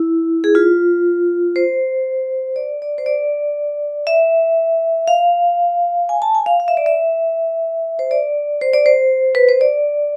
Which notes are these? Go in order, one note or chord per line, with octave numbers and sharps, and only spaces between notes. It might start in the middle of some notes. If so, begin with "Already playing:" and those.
Already playing: E4
G#4
F4
C5
D5
D5
C5
D5
E5
F5
G#5
A5
G#5
F5
F5
E5
D5
E5
C5
D5
C5
D5
C5
B4
C5
D5